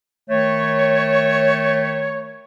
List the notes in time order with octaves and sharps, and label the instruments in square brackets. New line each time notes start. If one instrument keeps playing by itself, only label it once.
[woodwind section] D#3 A3 C#5